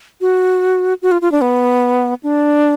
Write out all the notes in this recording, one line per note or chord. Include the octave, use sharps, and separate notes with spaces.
F#4
F#4
F4
F4
D4
B3
D4